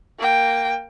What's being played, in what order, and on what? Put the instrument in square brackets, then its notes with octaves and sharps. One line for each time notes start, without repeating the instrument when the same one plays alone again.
[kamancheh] A#3 G5